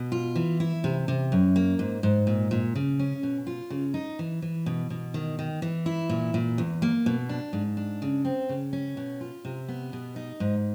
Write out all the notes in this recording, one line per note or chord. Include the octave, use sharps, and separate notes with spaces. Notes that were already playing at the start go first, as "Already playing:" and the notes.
Already playing: B2
F4
E3
E4
C3
C3
F#2
A#3
G#2
G#2
A#2
A#2
C#3
C#4
B2
F4
C#3
D#4
E3
E3
B2
B2
D#3
D#3
E3
E4
A#2
A#2
E2
A#3
B2
D4
G#2
D4
C#3
C4
C#3
C#4
B2
F4
C3
B3
B2
D#4
G#2